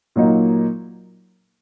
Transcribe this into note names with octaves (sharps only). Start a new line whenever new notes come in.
A#2 F#3 A#3 D#4